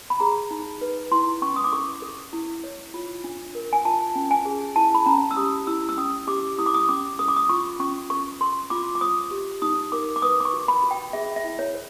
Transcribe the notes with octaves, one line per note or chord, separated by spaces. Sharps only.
B5
G#4 A#5
D#4
B4
E4 C6
C#4 C#6
D#6
D6
A4 C#6
A4
E4
C#5
F4
D4
A#4
G#5
F4 A5
C#4
G#5
G#4
E4 A5
B5
C#4 A#5
E6
G4 D#6
E4 E6
E6
C#4 D#6
G4 D6
E4 D#6
D6
D#6
C#4 D6
A4 D#6
D6
D#6
F4 C#6
C#4 C#6
A4 C#6
A4 C6
F4 D6
D6
C5 D#6
G4
D#4 D#6
A#4 D6
D6
B4 D#6
D6
C#6
F#4
B5
F#4
G5
G#4 E5
E5
E4
C#5
C5